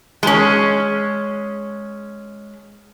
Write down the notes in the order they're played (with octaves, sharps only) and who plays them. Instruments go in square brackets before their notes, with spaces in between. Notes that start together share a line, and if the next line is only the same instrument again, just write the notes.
[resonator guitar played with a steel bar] G#3 C#4